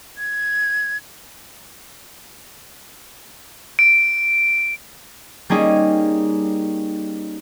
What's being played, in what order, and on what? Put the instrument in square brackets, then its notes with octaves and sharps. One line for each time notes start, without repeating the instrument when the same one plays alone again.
[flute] G#6
[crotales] D7
[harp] G3 A#3 C#4 D#4 G#4